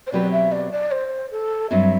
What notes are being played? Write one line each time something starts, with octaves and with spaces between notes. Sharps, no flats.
C5
B2 F#3 C4 G4 B4 D5
E5
D5
D5
C5
A4
G2 F#3 C4 E5